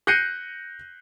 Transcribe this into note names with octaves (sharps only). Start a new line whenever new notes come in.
F#6 G6 A#6 C7 C#7 D#7